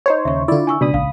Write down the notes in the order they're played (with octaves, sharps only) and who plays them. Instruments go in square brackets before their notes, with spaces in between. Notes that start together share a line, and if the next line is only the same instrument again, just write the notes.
[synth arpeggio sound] D#4 C5 C#5
[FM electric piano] D#2 C#3 [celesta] E5 C#6
[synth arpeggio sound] D3 E4 [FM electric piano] F4 D5
[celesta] G#5 C#6 E6
[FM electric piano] C#2 B5 D#6 [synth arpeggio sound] B2 [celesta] D4 D5
[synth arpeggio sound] A#1 [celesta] F5